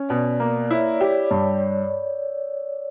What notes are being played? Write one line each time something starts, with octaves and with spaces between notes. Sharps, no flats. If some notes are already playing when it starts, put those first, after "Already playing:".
Already playing: C#4
B2 D5
A#3
E4 C#5
D5
G4 C#5
G2